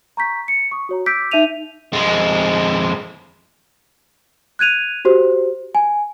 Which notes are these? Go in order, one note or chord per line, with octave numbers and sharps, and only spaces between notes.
A#5 C#6 G6 B6
C#7
C#6 D#6
F#4 C#5 A#5
D6 E6 G6 B6 D7
D#4 E5 G6 D#7 F7
F2 G#3
F#6 G#6 D#7 F7
F#4 G4 C5
G#5